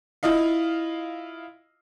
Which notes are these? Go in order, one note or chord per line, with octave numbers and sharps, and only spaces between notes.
E4 F4 D#5 F5